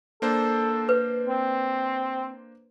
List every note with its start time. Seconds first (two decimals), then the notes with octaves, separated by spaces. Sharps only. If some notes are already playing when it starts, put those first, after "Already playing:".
0.22 A#3 D4 A4 C5
0.89 B4
1.27 C4